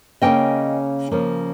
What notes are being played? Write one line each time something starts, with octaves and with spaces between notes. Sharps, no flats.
C#3 F3 A#3 C#4 D#5 G5
C#3 F3 A#3 C#4